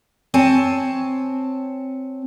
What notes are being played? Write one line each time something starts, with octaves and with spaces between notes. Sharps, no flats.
C4 C#5 G#5 A5